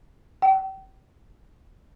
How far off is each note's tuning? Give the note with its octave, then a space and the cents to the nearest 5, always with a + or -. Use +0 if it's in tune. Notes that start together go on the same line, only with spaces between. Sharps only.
G5 -35